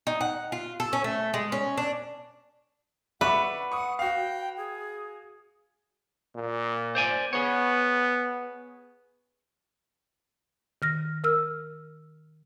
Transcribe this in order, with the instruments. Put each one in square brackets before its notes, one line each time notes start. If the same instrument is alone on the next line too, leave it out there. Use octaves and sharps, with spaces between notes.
[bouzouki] D#4
F#5
F4
A4
C#4
A3
G#3
C#4
D4
[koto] B4 [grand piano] D5 E5 C#6 [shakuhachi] F#5
[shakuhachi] F#5 [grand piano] C#6 D#6
[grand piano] F#4 F5 [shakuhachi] G5
[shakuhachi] G#4
[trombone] A#2
[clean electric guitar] C5 D5 G#5
[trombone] B3 [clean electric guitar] G#4 C#5
[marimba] D#3 F6 A#6
A#4 E6 F6